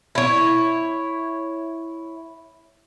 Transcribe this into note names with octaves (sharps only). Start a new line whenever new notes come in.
E4 C#5